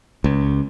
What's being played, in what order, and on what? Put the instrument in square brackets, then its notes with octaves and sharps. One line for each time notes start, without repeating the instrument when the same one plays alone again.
[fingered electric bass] C#2